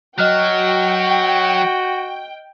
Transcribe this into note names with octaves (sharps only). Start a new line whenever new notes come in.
F#3 F#4 D#5 G5 F6 F#6